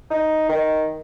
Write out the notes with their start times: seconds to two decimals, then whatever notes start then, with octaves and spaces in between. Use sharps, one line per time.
0.10 D#4
0.49 D#3